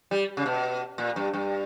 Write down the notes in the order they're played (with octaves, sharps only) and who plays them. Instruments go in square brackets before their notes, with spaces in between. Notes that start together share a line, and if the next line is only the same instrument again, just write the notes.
[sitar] G3
C#3
B2
A#2
G2
G2